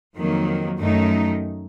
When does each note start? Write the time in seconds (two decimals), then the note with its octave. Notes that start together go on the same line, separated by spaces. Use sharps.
0.16 F2 D#3 F#3 A#3
0.79 F#2 D#3 A3 D#4